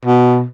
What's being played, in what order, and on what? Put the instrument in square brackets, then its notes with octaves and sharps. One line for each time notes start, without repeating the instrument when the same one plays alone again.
[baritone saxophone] B2